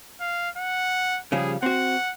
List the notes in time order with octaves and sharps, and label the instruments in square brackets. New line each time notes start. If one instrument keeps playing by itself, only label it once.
[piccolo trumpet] F5
F#5
[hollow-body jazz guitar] C#3 F3 G3 [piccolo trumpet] G#4
[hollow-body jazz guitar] C4 F#4 [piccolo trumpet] F#5